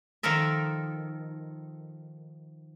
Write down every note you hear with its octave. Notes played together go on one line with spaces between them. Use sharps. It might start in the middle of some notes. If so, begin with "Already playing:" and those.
D#3 F3 A4 A#4 E5